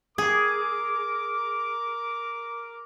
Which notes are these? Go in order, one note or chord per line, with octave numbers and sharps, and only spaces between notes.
G#4 A#4 D6